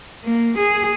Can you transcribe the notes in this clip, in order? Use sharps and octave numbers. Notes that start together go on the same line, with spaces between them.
A#3
G#4